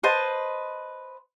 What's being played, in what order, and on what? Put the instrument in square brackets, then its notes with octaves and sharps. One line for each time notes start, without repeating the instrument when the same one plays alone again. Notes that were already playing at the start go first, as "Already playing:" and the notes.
[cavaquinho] B4 C5 D#5 A5